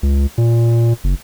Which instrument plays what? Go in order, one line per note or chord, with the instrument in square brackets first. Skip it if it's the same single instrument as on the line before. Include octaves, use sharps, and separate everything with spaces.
[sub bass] C#2
A#2
F#1